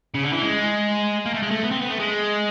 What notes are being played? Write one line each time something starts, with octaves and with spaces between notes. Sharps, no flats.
C#3
D3
E3
G#3
A#3
A3
G#3
A3
B3
C4
B3
A3
G#3